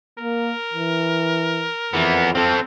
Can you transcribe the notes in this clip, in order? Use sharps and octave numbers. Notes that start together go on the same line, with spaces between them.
A#3 A#4
E3
F2 E3 B3
C4 A4 F5